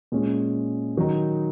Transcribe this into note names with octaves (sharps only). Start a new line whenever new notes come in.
A#2 G#3 C#4
D#3 F#3 D#4